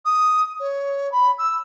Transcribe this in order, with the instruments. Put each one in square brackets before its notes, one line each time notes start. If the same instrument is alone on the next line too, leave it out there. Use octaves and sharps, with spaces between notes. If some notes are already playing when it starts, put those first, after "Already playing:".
[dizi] D#6
C#5
B5
E6